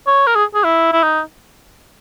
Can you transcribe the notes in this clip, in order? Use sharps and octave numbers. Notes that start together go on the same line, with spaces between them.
C#5
A#4
G#4
G#4
E4
E4
D#4